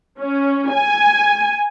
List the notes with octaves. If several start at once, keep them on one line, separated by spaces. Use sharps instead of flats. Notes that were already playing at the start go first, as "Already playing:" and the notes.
C#4
G#5